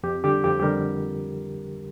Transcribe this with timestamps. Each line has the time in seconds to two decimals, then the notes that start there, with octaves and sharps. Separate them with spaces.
0.03 F2 G4
0.24 D3 G3 G4
0.44 F2 G4
0.60 G4
0.63 D3 G3 A#4